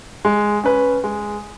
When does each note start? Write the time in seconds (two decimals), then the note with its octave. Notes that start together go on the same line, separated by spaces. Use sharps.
0.25 G#3
0.64 C#4 B4
1.04 G#3